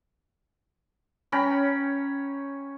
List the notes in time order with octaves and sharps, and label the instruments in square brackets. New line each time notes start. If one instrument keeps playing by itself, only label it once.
[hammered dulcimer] C#4 G5 A#5 B5